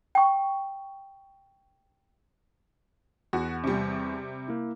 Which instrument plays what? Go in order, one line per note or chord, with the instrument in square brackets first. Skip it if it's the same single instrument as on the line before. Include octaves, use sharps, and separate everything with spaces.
[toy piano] G5 C#6
[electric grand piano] E2 [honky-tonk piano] F#4
[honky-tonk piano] C3 G3
[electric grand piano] A#3 E4